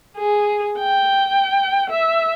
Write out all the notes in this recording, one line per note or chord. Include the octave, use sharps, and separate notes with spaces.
G#4
G5
E5